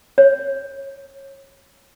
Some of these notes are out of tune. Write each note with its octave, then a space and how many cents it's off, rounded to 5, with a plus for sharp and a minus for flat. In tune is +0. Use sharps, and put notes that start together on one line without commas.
C#5 -25